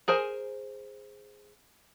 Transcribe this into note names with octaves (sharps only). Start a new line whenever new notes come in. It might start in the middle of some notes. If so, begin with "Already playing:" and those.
G#4 A#4 C5 G#5